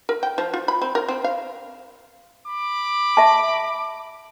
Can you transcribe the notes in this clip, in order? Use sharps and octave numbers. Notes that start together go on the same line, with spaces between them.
A#4
G5
F3
F4
B5
C4
A#4
C4
F5
B5 D6
E5 A5